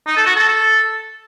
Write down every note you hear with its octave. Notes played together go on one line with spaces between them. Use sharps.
D#4
A4
F#4
A4